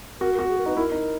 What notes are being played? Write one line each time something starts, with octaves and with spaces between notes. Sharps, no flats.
F#4 A#4
F#4 A#4
G#4
A#4
D#4 B4
E4 A#4
D#4